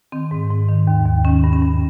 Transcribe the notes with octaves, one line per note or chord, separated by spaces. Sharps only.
D#3 C4
G#2
G#2
D#3
D#2
D#2
D#3 C#4
G2
C#4
G2